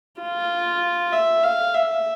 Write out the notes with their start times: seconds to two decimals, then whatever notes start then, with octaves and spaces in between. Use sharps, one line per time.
0.21 F4
1.13 E5
1.44 F5
1.74 E5